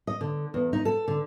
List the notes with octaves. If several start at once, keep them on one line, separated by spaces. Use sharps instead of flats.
D#5
D3
E2
D#4
A4
D3